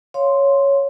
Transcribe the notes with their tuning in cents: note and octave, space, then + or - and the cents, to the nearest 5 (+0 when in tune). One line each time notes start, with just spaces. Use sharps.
C#5 +0 F5 +0 C6 +0